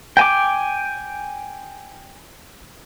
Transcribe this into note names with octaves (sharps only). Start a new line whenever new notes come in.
G5 G#5 D6